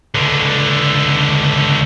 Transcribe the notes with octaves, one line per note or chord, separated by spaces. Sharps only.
C#2 D3